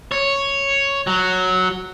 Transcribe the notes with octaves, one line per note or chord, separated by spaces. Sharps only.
C#5
F#3